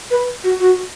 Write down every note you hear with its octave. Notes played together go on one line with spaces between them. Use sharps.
B4
F#4
F#4